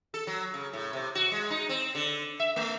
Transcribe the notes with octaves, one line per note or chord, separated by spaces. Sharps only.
A4
F#3
C#3
A2
C3
F#4
G#3
D#4
C4
D3
E5
A3